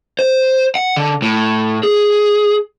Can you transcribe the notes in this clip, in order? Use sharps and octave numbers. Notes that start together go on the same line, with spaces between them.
C5
F#5
D3
A2
G#4